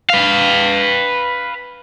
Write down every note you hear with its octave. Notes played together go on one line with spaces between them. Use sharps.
B4 F5